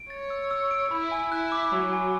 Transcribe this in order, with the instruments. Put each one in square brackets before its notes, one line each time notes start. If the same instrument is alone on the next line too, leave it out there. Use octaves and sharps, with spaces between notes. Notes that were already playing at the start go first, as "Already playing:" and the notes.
Already playing: [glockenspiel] D7
[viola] C#5 [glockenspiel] A6
[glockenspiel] E6
E6
D7
[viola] E4 [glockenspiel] B5
[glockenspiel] G#5
[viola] E4 [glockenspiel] F#6
[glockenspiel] D6
[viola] F#3 [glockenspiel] B5
[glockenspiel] G#5